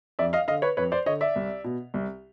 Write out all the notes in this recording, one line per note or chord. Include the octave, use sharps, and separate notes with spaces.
F2 D5 E5
D#5 F5
D3 D#5 F5
B4 C#5
F2 B4 C#5
C5 D5
D3 C#5 D#5
D5 E5
C2
B2
C2